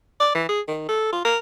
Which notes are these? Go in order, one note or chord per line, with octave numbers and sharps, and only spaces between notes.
D5
E3
G#4
D#3
A4
F4
A#4